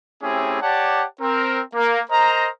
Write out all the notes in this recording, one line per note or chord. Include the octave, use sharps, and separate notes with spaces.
A3 C4 C#4 E4 G4 G#4
G4 C#5 D5 F#5 A5
C4 A#4
A#3
A#4 C5 D#5 A#5